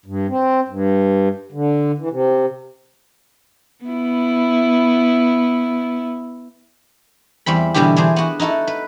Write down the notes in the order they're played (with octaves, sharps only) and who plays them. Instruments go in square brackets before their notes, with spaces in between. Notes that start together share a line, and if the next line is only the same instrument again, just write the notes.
[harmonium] G2
C4
G2
D3
E3
C3
[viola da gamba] B3 E4
[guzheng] E2 G3 C4 B5
B2 D3 E3 G3 E4 G4
E3 D4 G#4 C5
B3 F#4
D#4 E4 F#4 A4
B4